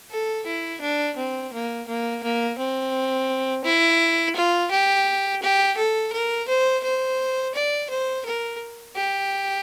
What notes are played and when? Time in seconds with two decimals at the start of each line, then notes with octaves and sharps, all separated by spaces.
0.11 A4
0.46 E4
0.81 D4
1.17 C4
1.53 A#3
1.88 A#3
2.23 A#3
2.59 C4
3.64 E4
4.36 F4
4.71 G4
5.42 G4
5.77 A4
6.13 A#4
6.48 C5
6.84 C5
7.55 D5
7.90 C5
8.26 A#4
8.96 G4